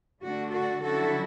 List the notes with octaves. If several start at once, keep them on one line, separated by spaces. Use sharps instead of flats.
D3 A3 D4 F#4
F#4 A4
D3 F#3 C#4 E4 F#4 A4